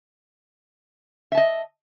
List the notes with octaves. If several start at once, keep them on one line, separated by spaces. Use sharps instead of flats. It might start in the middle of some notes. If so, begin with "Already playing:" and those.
D#5 E5 A5